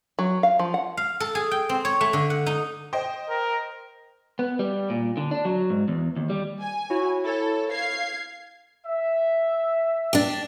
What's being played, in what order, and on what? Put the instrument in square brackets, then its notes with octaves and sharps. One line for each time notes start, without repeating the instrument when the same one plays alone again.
[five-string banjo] F#3
F5
F3
F#5
[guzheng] F5
A4
G#4
G5
C4
C#5
A3
D3
F#5
D#4
[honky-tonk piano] C5 D#5 G5
[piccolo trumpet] A#4
[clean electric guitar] B3
G3
A#2
D3
D4
F#3
G#2
E2
D#2
G3
[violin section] G#5
[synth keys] E4 F#4 C#5
[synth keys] E4 C#5 [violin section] A4
[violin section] F5 G#6 C7
[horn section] E5
[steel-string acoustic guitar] D4 G4